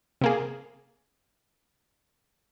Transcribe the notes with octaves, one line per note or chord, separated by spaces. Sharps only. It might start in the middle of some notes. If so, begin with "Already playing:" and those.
C3 A#3 G#4